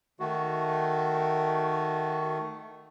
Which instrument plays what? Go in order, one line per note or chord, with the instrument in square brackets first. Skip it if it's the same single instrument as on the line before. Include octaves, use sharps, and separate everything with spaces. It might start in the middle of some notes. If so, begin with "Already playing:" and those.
[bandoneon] D#3 A3 [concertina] F#4